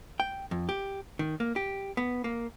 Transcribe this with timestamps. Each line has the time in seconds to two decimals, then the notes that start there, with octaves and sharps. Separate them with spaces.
0.20 G5
0.51 F2
0.69 G4
1.19 D#3
1.40 A#3
1.56 G4
1.97 B3
2.24 A#3